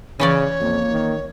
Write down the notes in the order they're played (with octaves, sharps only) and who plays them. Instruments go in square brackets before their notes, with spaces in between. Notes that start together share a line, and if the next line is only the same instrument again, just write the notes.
[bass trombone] C#3 [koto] E3 C#4 D5 [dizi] C#5
[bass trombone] F2 [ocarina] A#3
[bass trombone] D#3